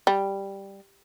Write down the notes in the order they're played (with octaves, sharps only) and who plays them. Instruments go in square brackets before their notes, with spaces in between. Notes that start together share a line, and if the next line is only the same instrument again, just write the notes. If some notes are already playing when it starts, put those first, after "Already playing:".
[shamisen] G3